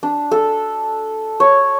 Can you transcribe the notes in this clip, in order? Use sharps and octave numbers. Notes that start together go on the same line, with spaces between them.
D4
A4
C#5